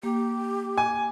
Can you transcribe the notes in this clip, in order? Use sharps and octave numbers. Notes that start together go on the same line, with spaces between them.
A#3 G4
G#5